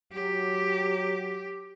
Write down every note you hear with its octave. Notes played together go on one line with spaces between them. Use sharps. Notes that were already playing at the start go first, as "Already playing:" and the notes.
F#3 G4